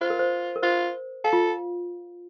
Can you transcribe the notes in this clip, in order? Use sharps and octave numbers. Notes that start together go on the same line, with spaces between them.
F4 C5
A#4
C5
A#4
F4 C5
A4 F5
F4